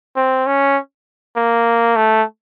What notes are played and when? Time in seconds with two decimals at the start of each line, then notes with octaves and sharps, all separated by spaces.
0.16 C4
0.46 C#4
1.36 A#3
1.96 A3